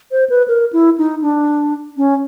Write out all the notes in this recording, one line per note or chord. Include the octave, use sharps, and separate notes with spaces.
C5
B4
A#4
E4
D#4
D4
C#4